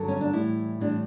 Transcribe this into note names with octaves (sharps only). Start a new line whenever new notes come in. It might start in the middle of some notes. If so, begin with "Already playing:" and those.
Already playing: G2 D3 F#3 A4
C#4
D4
A2 E3 G3 E4
A2 E3 G3 D4